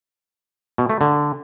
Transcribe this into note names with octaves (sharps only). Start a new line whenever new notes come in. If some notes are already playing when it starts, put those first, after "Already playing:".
B2
A3
D3